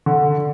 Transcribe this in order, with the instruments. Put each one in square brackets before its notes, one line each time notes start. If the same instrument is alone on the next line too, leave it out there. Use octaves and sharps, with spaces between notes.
[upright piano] D3